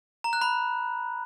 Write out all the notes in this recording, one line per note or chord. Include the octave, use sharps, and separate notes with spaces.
A#5
F#6
B5